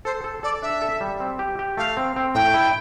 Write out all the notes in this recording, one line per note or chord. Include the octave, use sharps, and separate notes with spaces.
A4 C5
A4
A4 D5
D4 E5
A4
G3
C4
G4
G4
A3 F5
C4
C4
A2 G5
E4